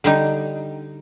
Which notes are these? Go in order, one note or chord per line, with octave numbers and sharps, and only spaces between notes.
D3 G3 D#4